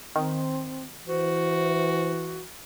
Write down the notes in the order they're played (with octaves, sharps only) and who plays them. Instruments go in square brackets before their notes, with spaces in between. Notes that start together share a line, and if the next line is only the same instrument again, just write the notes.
[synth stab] D#3 [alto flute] C4
[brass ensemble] E3 [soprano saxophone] F#4 [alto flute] C5